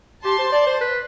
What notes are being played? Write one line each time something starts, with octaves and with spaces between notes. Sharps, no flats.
G4 A5 C6
C5
D5
C5
B4